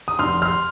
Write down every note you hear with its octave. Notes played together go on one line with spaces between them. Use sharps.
D#6
F1 C6 F6
C6 F6